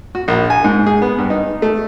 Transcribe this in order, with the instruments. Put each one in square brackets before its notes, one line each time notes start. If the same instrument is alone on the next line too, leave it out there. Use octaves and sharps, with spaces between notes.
[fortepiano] F#4
A#1
G#5
G#2
G#4
B3
G2
D#4
A3